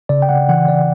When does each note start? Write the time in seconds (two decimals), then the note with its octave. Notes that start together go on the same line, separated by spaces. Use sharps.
0.09 C#3 D5
0.22 G5
0.29 C#3 F#5
0.49 E3 F#5
0.68 C#3 D5